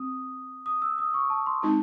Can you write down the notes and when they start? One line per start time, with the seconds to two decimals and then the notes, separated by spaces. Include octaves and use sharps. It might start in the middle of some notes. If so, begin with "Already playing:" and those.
Already playing: C4 D#6
0.66 D#6
0.82 E6
0.98 D#6
1.14 C#6
1.30 A5
1.46 C6
1.62 G#3 C4 D#4 F#4 A5